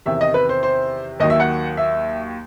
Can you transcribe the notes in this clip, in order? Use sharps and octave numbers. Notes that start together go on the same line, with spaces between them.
E2 C3 D#3 E5
D#5
B4
C5
C5
D#2 D#3 F#3 D#5
E5
F#5
E5